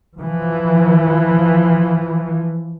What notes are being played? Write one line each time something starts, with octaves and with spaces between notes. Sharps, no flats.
E3 F3